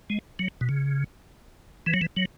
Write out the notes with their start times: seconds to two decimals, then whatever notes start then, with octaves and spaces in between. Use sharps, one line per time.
0.10 G#3
0.39 F#3
0.61 B2
0.69 C#3
1.86 E3
1.94 F#3
2.01 E3
2.16 F#3